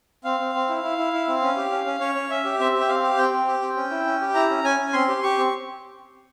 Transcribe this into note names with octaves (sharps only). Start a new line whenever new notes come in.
C4 F5
C4
C4
E4
E4
E4
E4
C4
C#4
G4
C#4
C#4
C#4 C#5
C#4
C#4 E5
G4
C4 E5
G4
G5
C4 F5
G4
C4 G5
C4
G4
C4
C#4
E4
C#4
G4
E4 A#5
C#4
C#4 G#5
C#4
C4 C6
G4
G4 C#6
C4